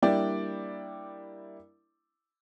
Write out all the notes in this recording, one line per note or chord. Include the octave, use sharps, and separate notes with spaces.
G3 A#3 D4 E4 D5 G5